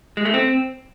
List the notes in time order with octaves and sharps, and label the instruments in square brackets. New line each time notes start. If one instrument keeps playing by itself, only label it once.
[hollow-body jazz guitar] G#3
A3
C4